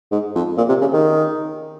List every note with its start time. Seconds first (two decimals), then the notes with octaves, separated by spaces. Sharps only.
0.11 G#2
0.35 F2
0.58 A#2
0.69 C3
0.81 C#3
0.93 D#3